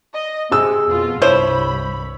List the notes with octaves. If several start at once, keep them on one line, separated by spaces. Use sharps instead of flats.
D#5
C3 G#4 E6
F2 B2 F4
C2 G2 F3 E4 C5 C#5 B5